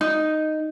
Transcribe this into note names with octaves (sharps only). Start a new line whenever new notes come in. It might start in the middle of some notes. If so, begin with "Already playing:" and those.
D#4